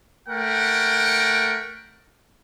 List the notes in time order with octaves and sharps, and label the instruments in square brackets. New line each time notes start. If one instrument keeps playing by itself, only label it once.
[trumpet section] A3 A#4 F#5 G5